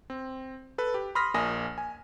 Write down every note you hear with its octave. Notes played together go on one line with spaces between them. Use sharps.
C4
A4 B4
G4
B5 C6 D#6 F6 A#6 B6
A#1 A#2 A#4 G#5 D#6 A#6
G#5